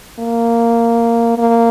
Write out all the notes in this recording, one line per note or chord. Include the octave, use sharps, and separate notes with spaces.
A#3
A#3